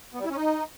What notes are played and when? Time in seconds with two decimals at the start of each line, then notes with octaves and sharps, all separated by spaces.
0.14 B3
0.19 G3
0.25 E4
0.31 C#4
0.36 D#4